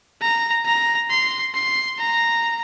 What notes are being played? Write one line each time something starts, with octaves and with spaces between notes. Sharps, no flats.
A#5
A#5
C6
C6
A#5